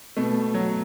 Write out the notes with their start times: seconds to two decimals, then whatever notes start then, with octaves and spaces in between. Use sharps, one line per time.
0.17 B2 A3
0.54 F#3